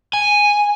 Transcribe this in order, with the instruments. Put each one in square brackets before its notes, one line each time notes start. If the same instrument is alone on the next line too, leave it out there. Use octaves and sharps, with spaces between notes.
[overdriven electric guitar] G#5